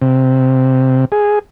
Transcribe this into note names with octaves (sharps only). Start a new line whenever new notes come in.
C3
G#4